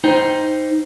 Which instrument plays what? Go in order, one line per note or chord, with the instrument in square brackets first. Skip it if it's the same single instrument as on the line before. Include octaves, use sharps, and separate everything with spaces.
[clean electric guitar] D#4 C5 G5